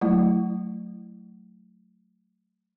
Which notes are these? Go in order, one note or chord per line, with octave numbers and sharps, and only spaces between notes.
F#3 A3 E4